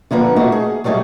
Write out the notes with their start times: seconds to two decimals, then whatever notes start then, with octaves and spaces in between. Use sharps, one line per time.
0.11 D3 F3 A#3 B3
0.36 A3 A#3 D#4 F#4
0.52 G#4
0.84 F#3 G3 A3 D#4 G#4